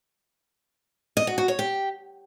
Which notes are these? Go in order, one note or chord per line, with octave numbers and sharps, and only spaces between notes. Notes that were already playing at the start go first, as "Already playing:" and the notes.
D#5
F#4
F#4
C#5
G4